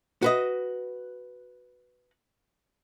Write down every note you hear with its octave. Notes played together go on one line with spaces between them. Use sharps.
F#4 B4 D#5